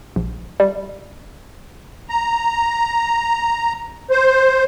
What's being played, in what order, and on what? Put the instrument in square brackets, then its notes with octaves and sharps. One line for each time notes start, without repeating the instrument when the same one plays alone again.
[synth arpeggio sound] A#1
G3
[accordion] A#5
C5